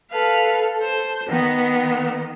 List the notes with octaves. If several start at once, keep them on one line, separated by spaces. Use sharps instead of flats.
A4 B4 F5
C5
D#3 B3